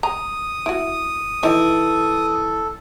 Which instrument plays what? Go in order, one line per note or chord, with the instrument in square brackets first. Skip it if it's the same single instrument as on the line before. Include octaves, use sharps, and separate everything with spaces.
[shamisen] A#5 [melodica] D#6
[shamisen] E4 F#4
[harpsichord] E3 [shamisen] D#4 D5 [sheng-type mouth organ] A4